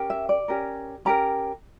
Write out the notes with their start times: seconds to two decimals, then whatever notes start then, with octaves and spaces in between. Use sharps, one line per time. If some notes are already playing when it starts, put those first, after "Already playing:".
Already playing: C#4 G4 A#4
0.10 E5
0.29 D5
0.48 C#4 G4 A#4
1.05 C#4 G4 A#4 A#5